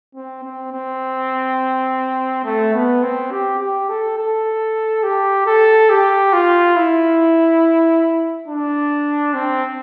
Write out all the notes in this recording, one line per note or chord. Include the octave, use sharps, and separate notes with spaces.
C4
C4
C4
A3
B3
C4
G4
G4
A4
A4
G4
A4
G4
F4
E4
D4
C4